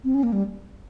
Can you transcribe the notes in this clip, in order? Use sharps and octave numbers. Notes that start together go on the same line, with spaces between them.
C4
C#4
A#3
G3